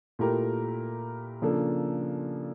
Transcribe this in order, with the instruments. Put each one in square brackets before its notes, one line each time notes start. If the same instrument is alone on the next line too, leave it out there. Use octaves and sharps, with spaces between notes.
[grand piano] A#2 A3 E4 G4 A#4
C#3 F3 A#3 D4 A4